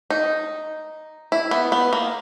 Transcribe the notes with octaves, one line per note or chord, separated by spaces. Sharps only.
D#4
E4
B3
B3
A#3